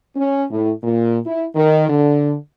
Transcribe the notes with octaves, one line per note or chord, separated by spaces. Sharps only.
C#4
A2
A#2
E4
D#3
D3